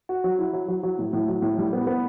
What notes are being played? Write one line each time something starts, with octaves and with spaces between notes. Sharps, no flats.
F#4
F#3
E4
F#3
F#3
F#3
A2
A2
F#3
A2
G3
B3
B3